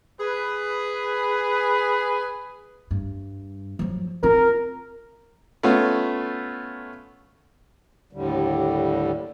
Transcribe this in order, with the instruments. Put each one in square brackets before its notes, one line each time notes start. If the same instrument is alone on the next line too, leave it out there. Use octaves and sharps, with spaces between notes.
[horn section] G#4 B4
[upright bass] G2
F3 F#3
[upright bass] C4 F4 [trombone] A#4
[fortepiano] A3 B3 C#4 F4
[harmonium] D#2 A2 D3 G3